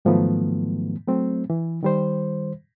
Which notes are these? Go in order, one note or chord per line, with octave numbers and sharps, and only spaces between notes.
G#2 D#3 F3 F#3 A3 B3
F#3 A3 C4
E3
D#3 G3 C5